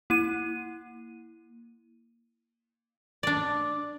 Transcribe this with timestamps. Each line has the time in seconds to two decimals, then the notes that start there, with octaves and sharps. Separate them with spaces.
0.10 A#3 E4 D#7
3.23 D4 D5